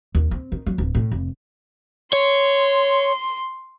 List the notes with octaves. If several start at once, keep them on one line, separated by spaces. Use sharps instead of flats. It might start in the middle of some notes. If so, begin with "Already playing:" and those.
D#2
C4
D#3
F#3
D1
A2
F1
C#5 C6